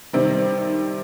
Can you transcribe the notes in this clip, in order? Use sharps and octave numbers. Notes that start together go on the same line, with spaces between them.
C3 D#3 G3 C4